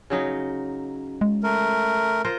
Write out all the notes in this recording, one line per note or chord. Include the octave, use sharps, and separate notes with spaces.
C#3 F#3 D#4
G#3
A3 A#4
F4 A#4 C5